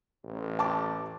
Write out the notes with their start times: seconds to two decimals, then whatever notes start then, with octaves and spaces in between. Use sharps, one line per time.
0.24 A1
0.59 A5 D6